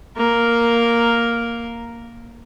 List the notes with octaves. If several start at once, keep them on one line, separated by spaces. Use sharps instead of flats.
A#3 A#4